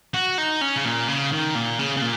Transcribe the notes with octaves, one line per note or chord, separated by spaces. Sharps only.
F#4
D#4
C#4
C#3
A#2
C#3
D#3
A#2
C#3
C#3
A#2